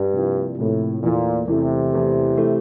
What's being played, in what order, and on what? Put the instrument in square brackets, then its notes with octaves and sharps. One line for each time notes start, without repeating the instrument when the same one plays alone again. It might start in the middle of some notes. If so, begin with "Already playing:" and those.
Already playing: [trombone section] G2
[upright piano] C3 F3 A#3 E4
[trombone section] A2 [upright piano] C3 F3 A#3 E4
[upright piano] E2 E3 A3 [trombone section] A#2
[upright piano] E2 E3 A3 [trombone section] C3
[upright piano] E2 E3 A3
E3 A3